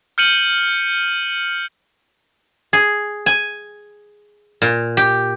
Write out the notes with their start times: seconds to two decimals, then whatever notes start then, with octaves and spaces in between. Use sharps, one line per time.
0.18 F6 G6 C#7 D#7 F#7
2.73 G#4
3.26 G#5
4.62 A#2
4.97 G4